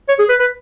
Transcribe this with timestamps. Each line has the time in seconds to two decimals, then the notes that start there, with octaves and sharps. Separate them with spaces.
0.08 C#5
0.19 G#4
0.29 B4
0.40 B4